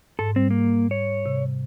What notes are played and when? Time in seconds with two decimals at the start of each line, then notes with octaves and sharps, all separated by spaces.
0.19 G#2 A4
0.36 G3 C4
0.50 A#3
0.91 C#5
1.26 C3